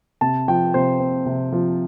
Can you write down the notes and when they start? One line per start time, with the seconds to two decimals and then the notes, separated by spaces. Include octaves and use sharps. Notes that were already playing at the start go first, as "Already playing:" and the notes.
0.21 C3 A5
0.48 F3 G5
0.74 C3 C5
1.00 C4
1.26 C3
1.52 F3